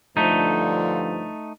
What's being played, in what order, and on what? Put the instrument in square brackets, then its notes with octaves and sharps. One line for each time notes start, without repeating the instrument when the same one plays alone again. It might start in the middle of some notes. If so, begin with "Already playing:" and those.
[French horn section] G2 D3 F3 [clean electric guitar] A3 D#4